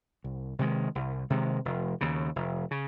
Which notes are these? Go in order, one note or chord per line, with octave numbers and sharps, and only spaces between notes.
C2
C3 D#3 G#3
C2
C3 D#3 G#3
F1
D#2 C#3
F1
C#3